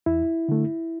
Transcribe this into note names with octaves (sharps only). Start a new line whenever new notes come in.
E2 E4
D3 A3